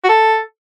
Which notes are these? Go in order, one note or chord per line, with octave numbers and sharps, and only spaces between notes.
F#4
A4